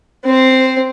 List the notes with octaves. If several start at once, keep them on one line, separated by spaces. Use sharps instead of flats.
C4 C5